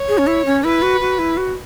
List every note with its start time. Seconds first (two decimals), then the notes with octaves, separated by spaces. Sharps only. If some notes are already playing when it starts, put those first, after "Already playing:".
Already playing: C#5
0.09 G#4
0.18 C#4
0.27 E4
0.45 C#4
0.64 E4 B4
0.82 F#4
1.01 F#4
1.19 E4
1.37 F#4